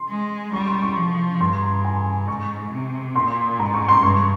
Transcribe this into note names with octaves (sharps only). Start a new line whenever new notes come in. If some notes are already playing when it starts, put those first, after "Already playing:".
Already playing: C6
G#3
G3 C#6
C6
C#6
F3
G2 C6
A#5
G#5
G#2 C#6
C3
A#2 C6
G#2 A#5
C#6
C6
G2 C#6